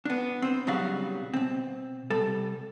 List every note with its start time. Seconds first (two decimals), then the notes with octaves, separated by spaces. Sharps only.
0.05 B3 D4
0.42 C4 C5
0.67 B1 C#3 F#3 G3 F#4 F5
1.34 B2 C4
2.10 C3 G3 A4